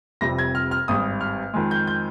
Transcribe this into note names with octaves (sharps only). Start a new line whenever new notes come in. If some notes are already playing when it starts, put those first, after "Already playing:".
F1 F2 C3 G3 A#6
G#6
F6
F6
G#1 G2 G3 D#6
F6
F2 D#3 G#3
G6
G6